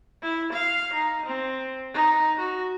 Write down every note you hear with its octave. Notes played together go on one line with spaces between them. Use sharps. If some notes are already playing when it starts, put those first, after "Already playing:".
E4
F5
D#4
C4
D#4
F#4